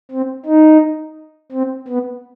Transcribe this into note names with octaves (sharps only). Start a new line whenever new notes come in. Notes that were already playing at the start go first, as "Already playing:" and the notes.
C4
D#4
C4
B3